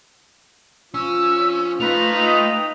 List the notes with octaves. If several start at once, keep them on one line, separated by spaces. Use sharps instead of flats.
F3 C#4 E6
A3 D#4 F4 B4 F7
D#5 G5